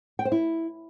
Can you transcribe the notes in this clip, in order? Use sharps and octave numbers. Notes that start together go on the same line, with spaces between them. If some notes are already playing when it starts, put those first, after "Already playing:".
G5
C5
E4